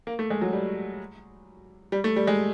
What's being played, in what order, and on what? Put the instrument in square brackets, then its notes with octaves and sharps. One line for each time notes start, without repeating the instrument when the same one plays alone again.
[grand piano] A#3
A3
G#3
F#3
G3
G3
A3
G3
G#3